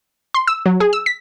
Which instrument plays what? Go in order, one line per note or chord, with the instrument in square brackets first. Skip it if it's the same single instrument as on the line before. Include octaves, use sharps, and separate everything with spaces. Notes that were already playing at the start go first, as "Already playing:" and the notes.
[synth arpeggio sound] C6
E6
F#3
G#4
E6
B6